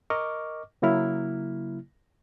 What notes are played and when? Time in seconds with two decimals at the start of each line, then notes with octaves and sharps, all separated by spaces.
0.10 A#4 D#5 C#6 D6 F6
0.82 C#3 F#3 A#3 E4 F6